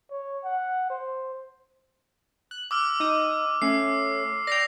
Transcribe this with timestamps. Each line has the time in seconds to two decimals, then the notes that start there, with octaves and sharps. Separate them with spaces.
0.11 C#5
0.44 F#5
0.90 C5
2.51 F#6
2.71 D6 E6 F6
3.00 D#4 D#6
3.62 A3 C#4 C7
4.47 D5 G5 A#6 C7 F7